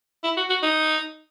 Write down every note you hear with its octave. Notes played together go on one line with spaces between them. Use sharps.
E4
F#4
F#4
D#4